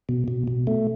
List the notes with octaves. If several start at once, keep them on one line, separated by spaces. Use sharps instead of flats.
B2
B2
B2
A3